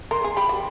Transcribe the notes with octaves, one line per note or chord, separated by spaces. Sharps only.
A#4 C6
G#4
G4 B5
F#4